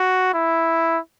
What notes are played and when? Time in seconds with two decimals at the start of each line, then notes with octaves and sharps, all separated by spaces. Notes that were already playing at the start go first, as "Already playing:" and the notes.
Already playing: F#4
0.34 E4